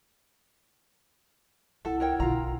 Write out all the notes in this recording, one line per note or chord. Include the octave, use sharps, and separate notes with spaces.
C2 E4 A4 F#5
A#4 C#5 G5
B1 D3 F4 A#5